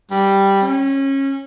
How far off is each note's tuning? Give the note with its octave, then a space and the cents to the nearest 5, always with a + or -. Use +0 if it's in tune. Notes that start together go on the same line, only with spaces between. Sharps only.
G3 +0
C#4 -25